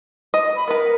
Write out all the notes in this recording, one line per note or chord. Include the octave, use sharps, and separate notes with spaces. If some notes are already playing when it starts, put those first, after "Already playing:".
D#5
B5
B3 A#4 B4